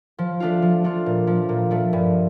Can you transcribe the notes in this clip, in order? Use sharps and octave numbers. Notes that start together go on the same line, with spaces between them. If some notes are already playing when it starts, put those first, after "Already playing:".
F3
A3 D4 F4
F3
A3 D4 F4
A#2
F3 A3
A#2
F3 A3
G2